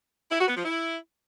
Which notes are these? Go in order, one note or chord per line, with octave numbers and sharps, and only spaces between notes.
E4
F#4
B3
F3
E4